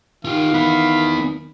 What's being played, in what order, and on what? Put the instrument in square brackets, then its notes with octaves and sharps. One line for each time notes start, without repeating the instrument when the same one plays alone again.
[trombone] D#3 [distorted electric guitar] F4 G4 [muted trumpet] F5
[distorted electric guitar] B3 E4 [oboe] B5